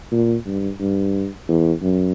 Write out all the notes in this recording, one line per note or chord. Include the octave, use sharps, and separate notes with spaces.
A#2
G2
G2
E2
F#2